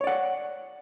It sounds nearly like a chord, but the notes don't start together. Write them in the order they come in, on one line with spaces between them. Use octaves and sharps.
C#5 D5 F#5